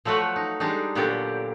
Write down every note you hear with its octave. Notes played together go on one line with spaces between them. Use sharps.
F3 F#3 A3 F#4 B4
D#4
G3 G#3 D4 D#4
A#2 D3 F#3 B3 G4